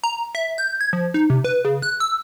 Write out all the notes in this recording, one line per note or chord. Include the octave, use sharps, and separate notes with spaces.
A#5
E5
G6
G#6
F3
D#4
C3
B4
C#3
F#6
E6